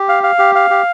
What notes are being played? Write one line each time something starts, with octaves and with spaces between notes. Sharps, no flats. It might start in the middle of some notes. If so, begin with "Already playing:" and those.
Already playing: G4
F5
F5
G4
F5
G4